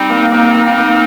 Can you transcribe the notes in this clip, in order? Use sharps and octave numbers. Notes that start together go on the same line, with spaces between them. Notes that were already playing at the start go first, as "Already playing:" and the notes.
Already playing: G3 C4 D#4
A#3
A#3 C4 D#4
A#3
C4 D#4
A#3